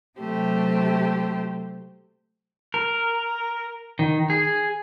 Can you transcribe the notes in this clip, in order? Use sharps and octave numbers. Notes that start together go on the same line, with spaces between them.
C3 F#3 A3 G4 C5
A#4
D#3
G#4